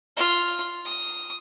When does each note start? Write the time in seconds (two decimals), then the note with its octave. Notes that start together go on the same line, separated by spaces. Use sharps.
0.17 F4
0.85 D#6